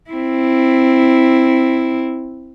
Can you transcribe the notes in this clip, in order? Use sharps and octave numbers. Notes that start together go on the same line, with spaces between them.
C4 E4